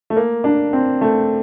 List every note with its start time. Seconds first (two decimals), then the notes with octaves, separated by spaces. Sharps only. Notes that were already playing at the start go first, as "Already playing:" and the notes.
0.10 A3
0.16 A#3
0.44 D4
0.73 C4
1.01 A3